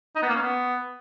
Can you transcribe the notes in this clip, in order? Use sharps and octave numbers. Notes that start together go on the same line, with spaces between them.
D#4
B3
A#3
C#4
B3